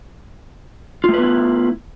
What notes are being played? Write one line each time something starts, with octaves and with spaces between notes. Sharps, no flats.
A3 B3 E4 F4 B4